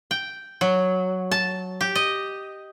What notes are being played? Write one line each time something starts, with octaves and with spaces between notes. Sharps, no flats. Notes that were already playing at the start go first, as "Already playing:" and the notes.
G5
F#3
A5
G4
D#5